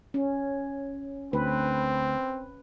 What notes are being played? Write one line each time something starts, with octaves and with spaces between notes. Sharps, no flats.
C#4
D2 C4 B4